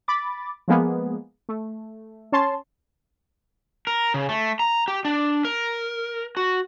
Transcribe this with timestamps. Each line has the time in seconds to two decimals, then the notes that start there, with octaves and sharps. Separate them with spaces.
0.08 B5 D6 A6
0.68 F3 G#3 A#3 B3 G#4
1.49 A3
2.32 C#4 C#5 A5 C6
3.87 A#4
4.14 C#3
4.29 A3
4.59 A#5
4.88 G4
5.05 D4
5.45 A#4
6.37 F#4